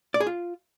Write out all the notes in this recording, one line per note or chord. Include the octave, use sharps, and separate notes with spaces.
D5
G#4
F4